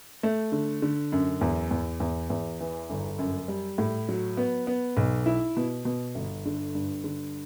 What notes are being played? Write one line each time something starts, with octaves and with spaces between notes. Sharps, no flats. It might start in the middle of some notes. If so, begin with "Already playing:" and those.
A3
D3
D3
F#2
E2
E2
E2
E2
E3
G1
F#2
G3
A2
F#3
B3
B3
B1
E4
B2
B2
G1
D3
G2
D3